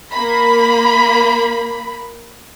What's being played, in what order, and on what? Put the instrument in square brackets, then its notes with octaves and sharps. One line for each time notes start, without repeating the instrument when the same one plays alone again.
[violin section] A#3 B5